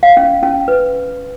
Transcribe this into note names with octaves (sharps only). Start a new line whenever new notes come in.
F5
C#4
C#4
B4